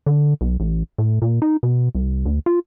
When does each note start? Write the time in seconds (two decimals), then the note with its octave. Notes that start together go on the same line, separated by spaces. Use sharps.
0.07 D3
0.41 B1
0.60 A1
0.98 A2
1.22 A#2
1.42 D#4
1.63 B2
1.95 C2
2.26 D2
2.46 F4